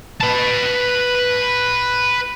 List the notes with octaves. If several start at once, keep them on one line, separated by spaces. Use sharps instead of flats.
B4 A5